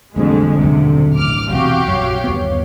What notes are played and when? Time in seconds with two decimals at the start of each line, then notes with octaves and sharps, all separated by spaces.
0.16 A1 F2 A2 D3 G3 G#3
0.59 D#1 B1 F#2 C3
1.14 A1 D6 F6
1.50 B1 E2 C3 F#4 G4 F5 D6
1.88 A#1 F#2 C#5
2.24 G1 D#2 B3